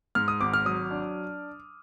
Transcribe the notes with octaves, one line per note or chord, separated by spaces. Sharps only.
G#2 F6
D#6
G#1 D6
F6
F#3 D#6
D4